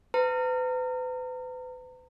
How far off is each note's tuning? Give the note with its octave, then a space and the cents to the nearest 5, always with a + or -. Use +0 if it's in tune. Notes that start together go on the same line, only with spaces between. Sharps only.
B4 +35 A#5 -35